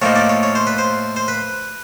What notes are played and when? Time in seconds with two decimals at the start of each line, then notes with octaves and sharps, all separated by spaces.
0.02 A2 F3 A#3 D#4 C#5
0.15 D5
0.29 C#5
0.43 C#5
0.55 C5
0.67 B4
0.78 C5
1.16 C5
1.28 B4